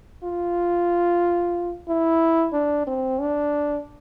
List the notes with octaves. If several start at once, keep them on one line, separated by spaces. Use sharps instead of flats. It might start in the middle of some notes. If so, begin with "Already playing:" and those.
F4
E4
D4
C4
D4